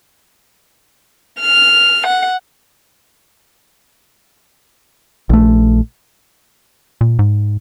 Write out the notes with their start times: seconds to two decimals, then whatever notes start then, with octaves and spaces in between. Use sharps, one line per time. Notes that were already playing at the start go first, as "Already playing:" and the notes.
1.41 F6
2.07 F#5
5.30 A#1 A3
7.01 A#2
7.19 G#2